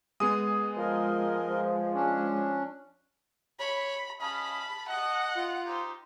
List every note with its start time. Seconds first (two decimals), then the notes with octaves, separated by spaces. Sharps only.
0.20 G#3 B3 G#4 D#6
0.77 F3 A#4 D#5
1.93 C#4 D4
3.59 C#5 B5
4.21 C#4 D#5 F5 A5 B5
4.88 D#5 F#5
5.35 F4
5.66 D#4 G4 C5